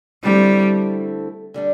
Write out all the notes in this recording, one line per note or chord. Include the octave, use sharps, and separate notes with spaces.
D3 G3 A3 C4 E4 A4
D3 G3 D4